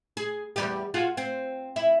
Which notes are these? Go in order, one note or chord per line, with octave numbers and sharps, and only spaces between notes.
G#4
E2 G3 G4
F4 F#4 G#4
C4
E4